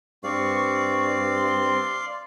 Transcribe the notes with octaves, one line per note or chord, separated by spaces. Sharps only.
G2 C4 D5 F5 C#6
C6